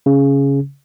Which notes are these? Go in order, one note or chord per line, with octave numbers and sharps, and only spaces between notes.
C#3